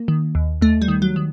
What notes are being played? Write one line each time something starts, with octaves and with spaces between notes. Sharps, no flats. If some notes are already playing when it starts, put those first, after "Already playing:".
Already playing: A#3
D#3
D#2
D#2 A3
G3
D#3
F#3
D#3